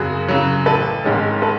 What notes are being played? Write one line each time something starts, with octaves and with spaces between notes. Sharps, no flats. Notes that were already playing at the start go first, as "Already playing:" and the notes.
Already playing: F#2 C#3 F#3 F#4 G#4
C#3 F#3
A1 A4 B4
G#2 D#3 G#3 C#4
A4 B4